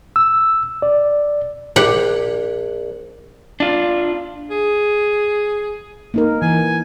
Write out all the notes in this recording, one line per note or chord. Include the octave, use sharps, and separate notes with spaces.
E6
D5
A#1 G4 F#5
D4 F4
G#4
A#3 D#4 A#4
E3 G#5